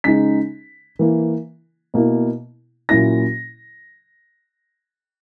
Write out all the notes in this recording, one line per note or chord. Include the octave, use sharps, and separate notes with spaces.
C#3 G#3 D#4 B6
E3 A#3 E4
B2 A#3 E4
A#2 F#3 A#3 C#4 E4 A#6